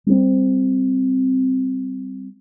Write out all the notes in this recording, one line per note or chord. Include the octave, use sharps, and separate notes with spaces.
G3 C4